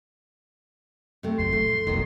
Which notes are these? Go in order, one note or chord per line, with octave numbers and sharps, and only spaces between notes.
C3 A3
F#2 A#2 C6
F3 A3
B1 F2 D#3